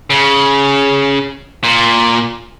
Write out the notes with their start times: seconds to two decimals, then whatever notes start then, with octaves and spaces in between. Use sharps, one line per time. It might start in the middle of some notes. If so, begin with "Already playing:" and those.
0.10 C#3
1.64 A#2